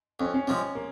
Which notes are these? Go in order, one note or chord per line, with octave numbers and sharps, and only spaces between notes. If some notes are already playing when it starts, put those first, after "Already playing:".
F2 C#4
C#4
C3 F3 G#3 C#4
A#3